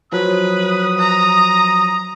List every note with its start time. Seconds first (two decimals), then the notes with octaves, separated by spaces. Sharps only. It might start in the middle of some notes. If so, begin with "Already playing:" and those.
0.12 F3 F#3 B4 D#6
0.99 A#5